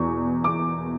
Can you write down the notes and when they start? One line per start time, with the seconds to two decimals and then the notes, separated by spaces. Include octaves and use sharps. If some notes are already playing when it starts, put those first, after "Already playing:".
Already playing: E2 B2 C#6
0.44 D6